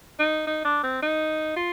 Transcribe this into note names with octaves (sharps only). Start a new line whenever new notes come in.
D#4
D#4
D4
C4
D#4
F4